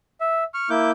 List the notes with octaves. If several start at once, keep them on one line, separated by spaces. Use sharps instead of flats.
E5
C#6 F6
A#3 E4 D6 G6